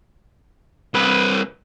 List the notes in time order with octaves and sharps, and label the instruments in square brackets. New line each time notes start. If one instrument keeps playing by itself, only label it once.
[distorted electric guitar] C2 B4